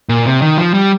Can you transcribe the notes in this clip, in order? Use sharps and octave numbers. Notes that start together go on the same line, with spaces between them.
A#2
C3
D#3
F3
G3